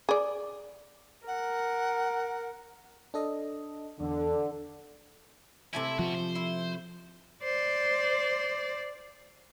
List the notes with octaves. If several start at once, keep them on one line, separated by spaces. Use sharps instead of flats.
G#4 D5
A#4 F#5
D4 A4 D#5
E2 D3
C3 A3 E4 G#5
F3 B3 F#4
C5
E4
C5 D5